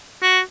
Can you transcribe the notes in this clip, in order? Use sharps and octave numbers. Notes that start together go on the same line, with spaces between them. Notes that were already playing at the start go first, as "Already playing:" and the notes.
F#4